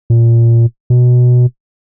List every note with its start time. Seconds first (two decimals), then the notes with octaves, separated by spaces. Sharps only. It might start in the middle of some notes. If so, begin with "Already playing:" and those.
0.10 A#2
0.90 B2